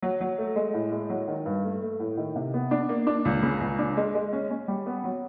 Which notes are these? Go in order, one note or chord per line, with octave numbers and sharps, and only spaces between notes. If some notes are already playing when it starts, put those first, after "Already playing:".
F#3
F#3
A3
G#3
A2
G#3
F#3
D#3
G2
A3
A3
A2
D#3
C3
B3
D4
A#3
D4
C#2
C#3
C#2
D4
G#3
G#3
C#4
C#4
G3
B3
F#3